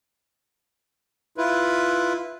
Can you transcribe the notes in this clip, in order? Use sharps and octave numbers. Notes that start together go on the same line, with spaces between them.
E4 F4 B4